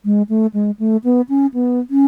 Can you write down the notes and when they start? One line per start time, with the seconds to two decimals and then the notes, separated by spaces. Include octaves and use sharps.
0.05 G#3
0.29 A3
0.54 G#3
0.79 A3
1.04 B3
1.29 C#4
1.54 B3
1.90 C#4